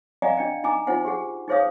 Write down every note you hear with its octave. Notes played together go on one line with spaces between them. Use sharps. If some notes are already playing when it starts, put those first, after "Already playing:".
D5 D#5 F5 F#5 G#5 A#5
D4 D#5 G5
D#4 G#5 A#5 D6
D#4 F4 C5 F#5 G#5
G4 G#4 F#5
D#4 G#4 C5 C#5 F5 D#6